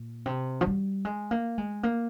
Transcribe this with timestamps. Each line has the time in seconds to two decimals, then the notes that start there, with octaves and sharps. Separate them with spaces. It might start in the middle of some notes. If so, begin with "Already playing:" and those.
Already playing: A#2
0.26 C3
0.61 F3
0.66 G3
1.05 G#3
1.31 A#3
1.58 G#3
1.83 A#3